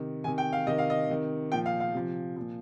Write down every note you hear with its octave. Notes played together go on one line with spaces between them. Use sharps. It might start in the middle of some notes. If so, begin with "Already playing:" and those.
Already playing: C3 D#3
C3 D#3 G#5
G5
F5
C3 D#3 D#5
F5
D#5
C3 D#3
A#2 F3 G5
F5
F5
C3 F3
A#2 F3